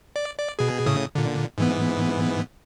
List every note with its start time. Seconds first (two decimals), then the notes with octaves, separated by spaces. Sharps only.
0.16 D5
0.39 D5
0.59 B2 G#4
0.86 A2 C#3 D#6
1.15 A#2 D3
1.58 G#2 E3 B3